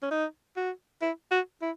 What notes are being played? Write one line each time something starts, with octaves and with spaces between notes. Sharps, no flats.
C#4
D#4
F#4
E4
F#4
E4